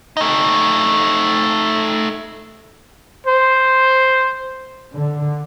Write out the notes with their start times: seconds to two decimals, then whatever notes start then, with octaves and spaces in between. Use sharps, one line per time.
0.17 A3 D#4
3.27 C5
4.92 D3